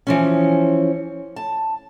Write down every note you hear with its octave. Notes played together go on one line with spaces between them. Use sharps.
E3 F3 C#4
A5